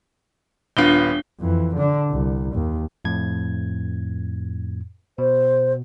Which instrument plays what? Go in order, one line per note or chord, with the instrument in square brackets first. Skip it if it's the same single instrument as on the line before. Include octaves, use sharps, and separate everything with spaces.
[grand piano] D#1 B3 F4 [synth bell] D4 G7
[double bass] F2 E3
D3 D4
C2
D#2
[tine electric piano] F2 A2 G#6
[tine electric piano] B2 [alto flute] C5